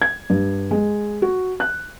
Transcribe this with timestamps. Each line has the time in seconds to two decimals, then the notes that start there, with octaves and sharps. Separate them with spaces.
0.02 G#6
0.30 G2
0.71 G#3
1.22 F#4
1.60 F#6